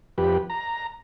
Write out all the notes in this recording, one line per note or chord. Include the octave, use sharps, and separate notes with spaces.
F2 G4 B4
A#5